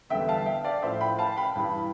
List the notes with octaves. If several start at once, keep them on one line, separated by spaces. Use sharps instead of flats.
E2 D3 G3 E5 G5
F5 A5
E5 G5
D5 F5
A2 F3 C5 E5
G5 B5
F5 A5
G5 B5
G2 E3 G3